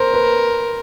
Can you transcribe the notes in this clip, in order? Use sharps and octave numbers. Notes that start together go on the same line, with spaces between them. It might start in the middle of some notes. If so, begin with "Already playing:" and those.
Already playing: A#4 C5
B4